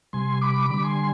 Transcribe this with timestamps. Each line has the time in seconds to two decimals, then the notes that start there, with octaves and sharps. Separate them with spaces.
0.13 C3 G3 G#5 C6
0.41 B5 D6
0.70 D3 G3 B5 D6
0.84 G#5 C6